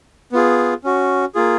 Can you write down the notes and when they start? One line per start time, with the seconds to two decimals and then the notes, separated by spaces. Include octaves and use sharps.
0.32 B3 F4 G#4
0.84 C#4 F#4
1.35 A#3 F4 G#4